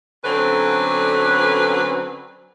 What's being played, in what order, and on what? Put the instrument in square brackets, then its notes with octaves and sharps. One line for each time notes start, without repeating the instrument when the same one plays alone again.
[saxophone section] D3 F#3 C4 C#4 A4 B4